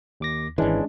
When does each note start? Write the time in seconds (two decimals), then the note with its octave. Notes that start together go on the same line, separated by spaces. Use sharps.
0.20 D#2 D6 A#6
0.58 G#1 E3 G#3 C#4 D4